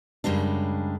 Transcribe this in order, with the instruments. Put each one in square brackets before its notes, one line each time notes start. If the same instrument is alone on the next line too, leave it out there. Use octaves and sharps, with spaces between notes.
[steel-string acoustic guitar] F#2 C#3 G3 G#3 D4